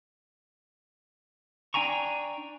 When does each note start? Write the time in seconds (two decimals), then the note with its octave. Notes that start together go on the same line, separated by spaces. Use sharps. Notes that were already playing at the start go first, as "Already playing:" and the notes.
1.74 D4 G5 G#5 A#5 C#6